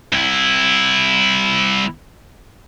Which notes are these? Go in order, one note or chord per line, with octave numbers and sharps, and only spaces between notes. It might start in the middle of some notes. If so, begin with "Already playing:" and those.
C2 E4